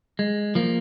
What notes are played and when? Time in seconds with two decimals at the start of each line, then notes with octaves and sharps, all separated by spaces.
0.19 G#3
0.55 F3 A#3